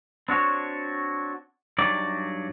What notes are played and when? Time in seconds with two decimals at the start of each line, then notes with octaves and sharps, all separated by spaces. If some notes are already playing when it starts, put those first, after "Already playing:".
0.29 C4 D4 F#4 C#5
1.78 G2 F#3 D#4 D5